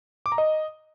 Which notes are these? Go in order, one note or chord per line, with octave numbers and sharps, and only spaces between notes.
D6
A#5
D#5